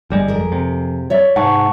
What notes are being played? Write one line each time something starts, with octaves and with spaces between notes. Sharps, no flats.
G1 G3 G#3
F2 G#4 A#4
C3
C#5 D5 E5
G#2 C3 F#5 A5 C#6